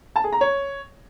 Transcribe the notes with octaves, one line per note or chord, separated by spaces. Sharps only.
A5
G#4
A#5
C#5